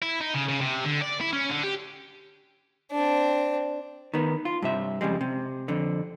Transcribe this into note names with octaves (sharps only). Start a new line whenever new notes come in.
E4
D#4
C#3
C#3
C3
D3
D5
E4
C#4
D3
G4
C4 D4
D#3 B3
F4
G2 C3 E5
F2 C#3 G3 G#3
C3
F2 D3